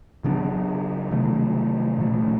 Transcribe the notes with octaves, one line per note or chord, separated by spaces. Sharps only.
C#3 F#3 B3 D4
C3 D#3 F#3 A3
A#2 F3 A3